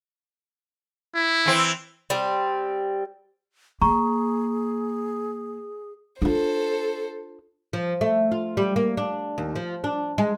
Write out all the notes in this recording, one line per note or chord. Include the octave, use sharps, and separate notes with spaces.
E4
E3 C4
G3 C4
A#3 G#4 A#5 C#6
D4 F4 A4 C5
F3
A3
F4
G3
A#3
D4
D#2
F3
D4
G#3